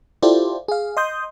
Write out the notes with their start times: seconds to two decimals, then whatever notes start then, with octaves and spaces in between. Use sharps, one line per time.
0.22 E4 F4 G4 A4 C5 D5
0.68 G#4 F5
0.97 D#5 C6 D#6 G6